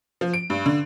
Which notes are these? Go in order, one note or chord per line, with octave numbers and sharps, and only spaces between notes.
F3
D7
G2
D3